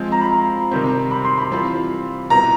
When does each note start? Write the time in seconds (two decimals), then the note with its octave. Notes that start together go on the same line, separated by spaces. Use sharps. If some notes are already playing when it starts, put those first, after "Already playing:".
Already playing: F3 G#3 C4 F4
0.12 A#5
0.21 B5
0.31 A#5
0.71 C3 D#3 G3 C4
1.11 B5
1.25 C6
1.38 B5
1.51 E3 G3 C4 F4
2.30 B2 G3 B3 E4 A#5